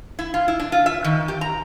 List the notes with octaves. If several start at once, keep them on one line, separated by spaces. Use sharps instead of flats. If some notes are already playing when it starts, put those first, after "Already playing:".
E4
F4
E4
D4
F4
E5
D#3
G4
A#5